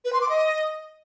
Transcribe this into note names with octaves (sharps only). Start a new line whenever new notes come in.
B4
C6
D6
D#5